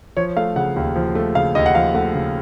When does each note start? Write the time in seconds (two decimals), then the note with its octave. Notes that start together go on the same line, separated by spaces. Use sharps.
0.17 F3 C#5
0.37 A3 F5
0.56 C#3 F#5
0.76 D#2
0.96 F3
1.15 A3
1.35 C#3 F5
1.55 D#2 D#5
1.66 F#5
1.75 F3 F5
1.94 A3 F#5
2.15 C#3